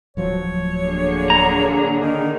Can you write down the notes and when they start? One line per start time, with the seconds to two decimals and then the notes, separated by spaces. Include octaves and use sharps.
0.17 D1 F3 F#3 C#5
0.84 D3 A#3 G#4
1.30 A#5
1.99 D#3